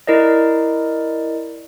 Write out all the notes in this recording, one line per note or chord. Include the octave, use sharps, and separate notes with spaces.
E4 A#4 D5 D#5